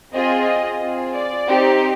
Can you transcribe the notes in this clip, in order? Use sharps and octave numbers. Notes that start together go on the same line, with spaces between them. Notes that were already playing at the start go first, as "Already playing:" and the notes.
C4 F4 G#4 D#5
C4 F4 G#4
D5
C4 D#4 G4